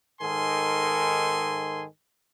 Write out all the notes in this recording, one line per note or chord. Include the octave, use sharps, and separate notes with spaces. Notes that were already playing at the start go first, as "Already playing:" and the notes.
G#2 D#3 A4 A#4 G#5 C6